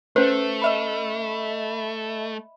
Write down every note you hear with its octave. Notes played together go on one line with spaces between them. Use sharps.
A3 C#4 B4 C5
D#5 E5 B5